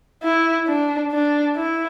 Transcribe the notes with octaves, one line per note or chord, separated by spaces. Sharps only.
E4
D4
D4
E4